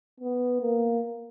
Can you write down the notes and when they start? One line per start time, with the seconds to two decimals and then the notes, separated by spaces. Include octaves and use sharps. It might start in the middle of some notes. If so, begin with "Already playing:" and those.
0.20 B3
0.61 A#3